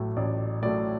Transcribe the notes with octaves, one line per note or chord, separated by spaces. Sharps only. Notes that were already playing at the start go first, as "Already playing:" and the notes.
Already playing: A1 A2 F#3 A3
A1 D5
A2 F#3 A3 D5